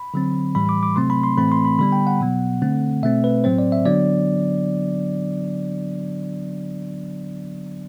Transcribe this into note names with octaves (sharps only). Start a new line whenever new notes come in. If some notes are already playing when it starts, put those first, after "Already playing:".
Already playing: B5
D3 F#3 C4
A2 E3 G3 B5
D6
D6
C3 F#3 A3 C4 C6
B5
C6
A2 E3 A3 C4 B5
C6
B5
D3 G3 B3 B5
G5
F#5
B2 F#3 B3
D3 A3 C4
B2 A3 C4 E5
B4
A2 F#3 C4 C5
D5
E5
D3 F#3 B3 D4 D5